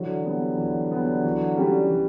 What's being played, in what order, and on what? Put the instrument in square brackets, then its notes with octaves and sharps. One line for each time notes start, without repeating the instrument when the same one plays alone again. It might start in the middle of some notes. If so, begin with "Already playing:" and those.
Already playing: [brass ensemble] D3 F#3 [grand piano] E3
[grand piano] G3 B3
E3
G3 B3
E3
G3 C#4 G4
E3